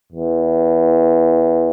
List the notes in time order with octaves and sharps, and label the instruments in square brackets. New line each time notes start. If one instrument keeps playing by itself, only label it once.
[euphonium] E2